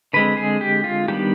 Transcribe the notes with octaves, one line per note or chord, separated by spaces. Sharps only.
D3 G#3 C4 B4
G#4
G4
F4
D#3 G3 B3 D4 G4